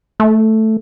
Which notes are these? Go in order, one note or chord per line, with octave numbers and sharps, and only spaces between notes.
A3